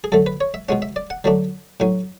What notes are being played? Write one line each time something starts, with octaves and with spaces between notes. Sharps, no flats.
G#4
F#2 D3 A3 A4
B4
C#5
E5
B2 G#3 C#4 F#5
E5
D5
F#5
D3 F#3 A3 D4
A2 F#3 C#4